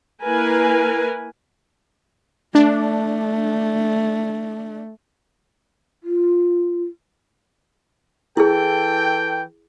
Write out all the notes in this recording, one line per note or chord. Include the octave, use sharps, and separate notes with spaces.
A#3 E4 A#4 B4 G#5
A3 D4
F4
E3 E4 G#4 A4 G5